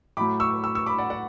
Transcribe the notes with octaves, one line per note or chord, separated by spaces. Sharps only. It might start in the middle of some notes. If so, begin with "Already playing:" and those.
A2 F#3 A3 B5 D6
C#6 E6
C#6 E6
C#6 E6
B5 D6
D5 F#5
D5 F#5